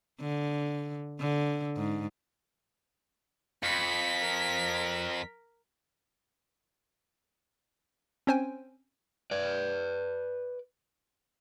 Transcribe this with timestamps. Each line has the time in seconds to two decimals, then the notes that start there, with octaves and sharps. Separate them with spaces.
0.21 D3
1.20 D3
1.77 G#2
3.63 F2 B5 B6 C#7
4.21 A#4
8.27 C4 C#4 C5 G5 G#5
9.31 B4 D5